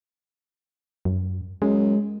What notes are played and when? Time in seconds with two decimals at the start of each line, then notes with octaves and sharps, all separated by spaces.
1.05 F#2
1.62 F#2 G#3